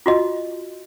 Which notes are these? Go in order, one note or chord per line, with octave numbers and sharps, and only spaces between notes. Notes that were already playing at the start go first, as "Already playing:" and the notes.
F4 F#4 D#5